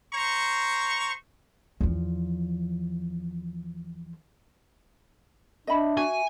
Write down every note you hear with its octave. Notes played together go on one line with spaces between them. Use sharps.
C5 A#5 C#6
E2 F3
D4 D#5 E5 B5
F#4 G#5